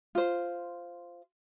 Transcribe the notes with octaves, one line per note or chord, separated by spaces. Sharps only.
F4 C5